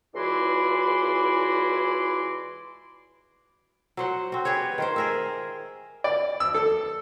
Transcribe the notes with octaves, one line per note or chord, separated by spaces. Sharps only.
C#2 E3 E4 F#4 D5 C6
F#3 C5 F#5
C4 F#4
G4 G#4 B4 C#5
D#3 F4 C5
G#4 A#4 E5
D5
E6
A4